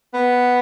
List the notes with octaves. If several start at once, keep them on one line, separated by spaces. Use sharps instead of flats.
B3